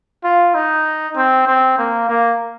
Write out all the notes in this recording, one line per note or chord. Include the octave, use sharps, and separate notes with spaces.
F4
D#4
C4
C4
A#3
A#3